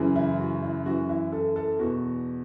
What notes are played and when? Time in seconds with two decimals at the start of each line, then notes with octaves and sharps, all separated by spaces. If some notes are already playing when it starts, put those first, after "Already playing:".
Already playing: F#2 C#3 E3
0.16 E4
0.40 F#4
0.62 E4
0.86 F#2 E3 F#4
1.09 E4
1.32 A4
1.56 A4
1.79 E2 B2 F#4